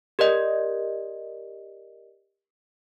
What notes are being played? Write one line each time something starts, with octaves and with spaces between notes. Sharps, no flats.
G4 A#4 D5 D#5